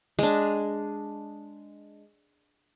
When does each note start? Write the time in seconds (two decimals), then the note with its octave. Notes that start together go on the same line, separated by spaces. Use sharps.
0.19 G#3 D4